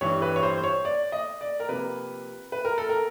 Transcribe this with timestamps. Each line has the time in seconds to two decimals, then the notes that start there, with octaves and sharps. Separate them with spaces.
0.01 G2 E3 G3 C#5
0.22 B4
0.36 C#5
0.43 C5
0.58 C5
0.64 C#5
0.85 D5
1.12 D#5
1.41 D5
1.60 A#4
1.69 C3 F3 A#3 B4
2.52 B4
2.65 A#4
2.78 A4
2.89 A#4